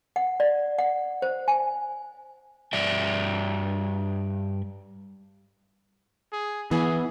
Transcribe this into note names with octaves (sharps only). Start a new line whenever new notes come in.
F#5
D5
F#5
C5
G#5
G2 D5 E5
G#4
E3 B3 G#4